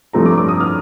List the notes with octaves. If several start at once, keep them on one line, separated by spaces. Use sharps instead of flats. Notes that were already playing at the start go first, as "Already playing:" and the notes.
G2 F3 A3 C4 A#5
D6
D6
D#6
F6